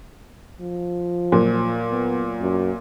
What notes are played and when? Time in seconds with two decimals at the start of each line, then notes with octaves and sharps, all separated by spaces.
0.61 F3
1.32 A#2 F#3
1.91 B3
2.41 F#2